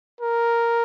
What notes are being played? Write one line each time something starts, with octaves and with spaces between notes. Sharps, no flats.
A#4